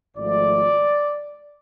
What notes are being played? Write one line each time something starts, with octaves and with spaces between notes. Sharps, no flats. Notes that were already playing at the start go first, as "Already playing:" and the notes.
G#1 G#2 F3 A3 D5